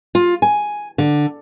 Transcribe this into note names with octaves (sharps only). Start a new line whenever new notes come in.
F4
G#5
D3